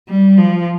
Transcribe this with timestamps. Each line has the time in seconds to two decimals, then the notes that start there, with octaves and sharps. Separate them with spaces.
0.09 G3
0.38 F3